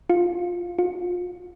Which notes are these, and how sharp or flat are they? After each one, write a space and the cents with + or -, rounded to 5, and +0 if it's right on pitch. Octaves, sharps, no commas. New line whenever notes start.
F4 +10
F4 +35